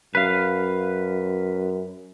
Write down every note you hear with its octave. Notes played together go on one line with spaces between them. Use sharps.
F#2 B4 F5